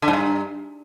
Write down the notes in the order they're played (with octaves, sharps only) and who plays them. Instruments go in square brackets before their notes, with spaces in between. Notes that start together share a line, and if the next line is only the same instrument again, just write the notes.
[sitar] D3
G#2
G2